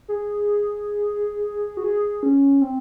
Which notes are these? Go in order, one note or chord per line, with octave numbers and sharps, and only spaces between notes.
G#4
F#4
G#4
C#4
C4